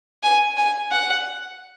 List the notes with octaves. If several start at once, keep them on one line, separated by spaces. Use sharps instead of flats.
G#5
G#5
F#5